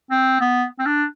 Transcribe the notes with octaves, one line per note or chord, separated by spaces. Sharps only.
C4
B3
C4
D4